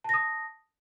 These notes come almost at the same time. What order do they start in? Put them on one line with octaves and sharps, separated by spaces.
A5 A#6 D#6